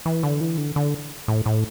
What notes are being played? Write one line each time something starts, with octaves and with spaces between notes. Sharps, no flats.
E3
D3
E3
D3
D3
A2
A2